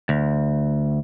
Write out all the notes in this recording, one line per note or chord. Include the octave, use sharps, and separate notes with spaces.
D2